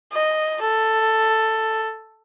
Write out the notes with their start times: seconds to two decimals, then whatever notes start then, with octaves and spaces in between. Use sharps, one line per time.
0.13 D#5
0.61 A4